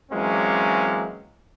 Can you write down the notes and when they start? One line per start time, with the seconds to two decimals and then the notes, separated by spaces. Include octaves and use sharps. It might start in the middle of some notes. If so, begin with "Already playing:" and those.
0.12 E3 F#3 G#3 A#3 C4 C#4